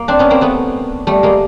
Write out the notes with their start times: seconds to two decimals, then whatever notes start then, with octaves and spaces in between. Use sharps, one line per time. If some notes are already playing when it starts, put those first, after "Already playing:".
Already playing: A#3
0.08 C4 D4
0.19 B3 C#4
0.30 A#3 C4
0.41 A3 B3
1.07 G3 A3
1.23 G#3 A#3